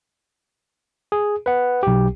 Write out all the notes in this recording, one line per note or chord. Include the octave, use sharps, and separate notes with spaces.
G#4
B4 F#5
B1 G4